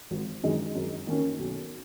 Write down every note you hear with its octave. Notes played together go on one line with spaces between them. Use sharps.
G#1
F#2 D#3 G#3 D#4
F#2
D#3 A#3 C#4
B1